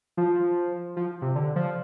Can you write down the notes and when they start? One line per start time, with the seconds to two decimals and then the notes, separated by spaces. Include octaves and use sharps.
0.17 F3
0.96 F3
1.22 C3
1.35 D3
1.56 F3